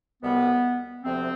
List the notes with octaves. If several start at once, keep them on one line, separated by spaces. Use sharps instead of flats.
C2 B2 G3 B3
D2 C3 F3 C4